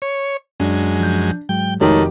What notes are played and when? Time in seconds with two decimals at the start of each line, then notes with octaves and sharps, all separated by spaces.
0.02 C#5
0.60 F#2 G#3 D4
1.00 F3 G6
1.49 G#2 F#3 G#3 G5
1.81 F1 D#3 G#3 A3 F#4 G4 C#5